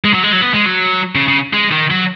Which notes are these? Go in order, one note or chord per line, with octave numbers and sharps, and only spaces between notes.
G#3
F#3
G#3
F#3
B3
G#3
F#3
C#3
C#3
G#3
D#3
F#3